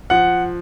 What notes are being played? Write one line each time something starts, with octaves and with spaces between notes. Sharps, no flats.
F3 F#5